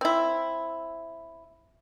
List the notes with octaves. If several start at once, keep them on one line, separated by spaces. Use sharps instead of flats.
C4 E4